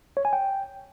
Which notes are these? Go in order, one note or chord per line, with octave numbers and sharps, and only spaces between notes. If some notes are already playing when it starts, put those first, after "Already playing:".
C#5
G#5
G5